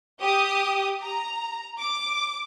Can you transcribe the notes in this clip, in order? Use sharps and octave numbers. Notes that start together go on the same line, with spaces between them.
G4 D#6
A#5
D6